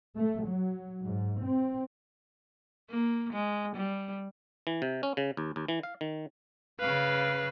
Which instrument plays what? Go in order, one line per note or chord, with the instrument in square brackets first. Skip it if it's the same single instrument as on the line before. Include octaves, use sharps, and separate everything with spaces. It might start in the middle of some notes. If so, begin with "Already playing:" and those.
[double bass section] A3
F#3
G#2
C4
[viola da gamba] A#3
G#3
G3
[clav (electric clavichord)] E3
C3
C#4
C#3
D#2
D#2
E3
F5
D#3
[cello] C#3 F5 [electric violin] B4